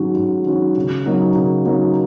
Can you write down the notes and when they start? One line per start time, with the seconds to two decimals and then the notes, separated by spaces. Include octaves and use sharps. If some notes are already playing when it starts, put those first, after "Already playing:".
Already playing: G#2 D#3 F#3 C#4 F#4
0.16 G#2
0.46 D#3 F#3 C#4 F#4
0.76 C#3
1.06 F#3 A#3 D#4
1.35 C#3
1.65 F#3 A#3 D#4